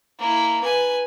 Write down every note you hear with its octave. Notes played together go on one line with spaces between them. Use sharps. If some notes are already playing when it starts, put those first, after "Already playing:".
A#3 E4
B4 G#5